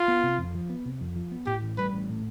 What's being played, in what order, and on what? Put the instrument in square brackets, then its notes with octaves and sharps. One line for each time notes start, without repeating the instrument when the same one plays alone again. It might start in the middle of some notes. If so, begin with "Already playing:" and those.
Already playing: [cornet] F4
[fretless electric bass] B3
C3
F2
F3
B3
C3
F2
F3
B3
[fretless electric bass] A2 [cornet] G4
[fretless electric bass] A1
[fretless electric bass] G3 [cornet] B4
[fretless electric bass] A1
A2